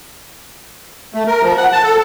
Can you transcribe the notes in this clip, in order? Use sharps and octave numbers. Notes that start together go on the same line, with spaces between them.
A3
A#4
F3
F#5
A5
A4